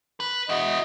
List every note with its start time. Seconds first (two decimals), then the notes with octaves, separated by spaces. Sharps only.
0.20 B4
0.49 E4 F#4 D#5